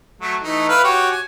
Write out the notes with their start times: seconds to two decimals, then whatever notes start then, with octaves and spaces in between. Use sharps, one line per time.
0.21 F#3 A3
0.43 E3 A3 D#4
0.69 E4 B4 F5
0.84 F#4 G4 C#5
1.11 G#5